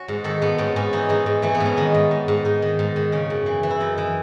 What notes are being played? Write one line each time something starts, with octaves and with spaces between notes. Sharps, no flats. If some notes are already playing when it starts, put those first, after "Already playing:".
Already playing: C#4 F#4
G#2
D#3 A4
G#2 B3
G#2 C#4
G#2 C#4
E3 D#4
G#2 D#4
G#2
E3 A3
B3
G#2
C#4
D#3 D#4
G#2
G#2
G#2
G#2 D#4
D#3
G#2
D#3
C#3 C#4
F#2
E3
E3
E4
F#2 D#4
E3